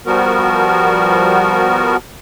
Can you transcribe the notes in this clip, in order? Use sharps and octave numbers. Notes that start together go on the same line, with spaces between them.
F3 G3 B3 F#4 A#4